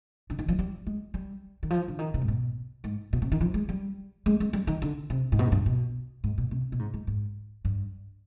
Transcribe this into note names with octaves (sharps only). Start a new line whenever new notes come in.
D3
D#3
F3
G3
G#3
G3
D#3
F3
D3
D#3
C3
G#2
B2
G#2
B2
C3
D#3
F3
G#3
G3
G#3
G#3
G3
D#3
D3
C3
G#2
B2
G#2
G2
B2
G#2
B2
C3
B2
G#2
G#2
G#2
G2